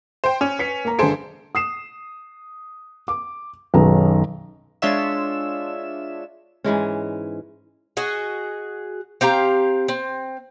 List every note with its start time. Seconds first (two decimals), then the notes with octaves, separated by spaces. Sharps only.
0.24 C5 G5
0.41 C#4
0.59 B4 B6 C#7
0.85 A#3 A#5
0.99 G1 G#4 A4 C5 D7
1.55 D#6 C7 E7
3.08 D6
3.74 B1 F#2 D#3 G#4 B4 A#5
4.82 G#3 D4 F4 C#5 E5 E7
6.64 G#2 E3 G#3 C#4
7.97 F#4 G#4 D#5
9.21 C4 G4 F5 A#5
9.88 C4